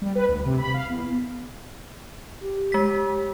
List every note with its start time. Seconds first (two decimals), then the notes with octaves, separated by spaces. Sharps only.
0.02 G3
0.15 B4
0.28 D2
0.46 C3
0.58 B5
0.74 F5
0.90 E2
2.42 G4
2.72 G#3 B6